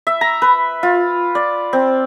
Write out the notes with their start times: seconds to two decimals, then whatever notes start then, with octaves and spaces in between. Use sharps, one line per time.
0.07 E5
0.21 A#5
0.42 B4
0.83 F4
1.35 D5
1.73 C4